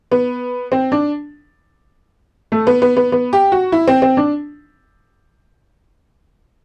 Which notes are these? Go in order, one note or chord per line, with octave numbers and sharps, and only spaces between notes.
B3
C4
D4
A3
B3
B3
B3
B3
G4
F#4
E4
C4
C4
D4